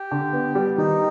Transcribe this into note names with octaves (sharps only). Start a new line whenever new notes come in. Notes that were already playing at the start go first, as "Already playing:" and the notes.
Already playing: G4
D3
B3
G3
D#3 D#4